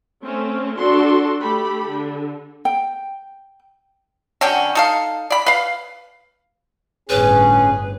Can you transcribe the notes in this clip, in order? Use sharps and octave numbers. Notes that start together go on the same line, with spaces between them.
A3 C4 C#4
D4 F#4 A4 C6
A3 G4 A4 B5
D3
G5
D3 F#3 C#4 G5
D#4 A4 F5
D5 B5
B4 F5
G1 A2 C#4 G#4 B4